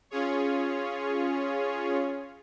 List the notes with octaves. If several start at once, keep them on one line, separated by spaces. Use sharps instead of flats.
C#4 F4 G#4 C#5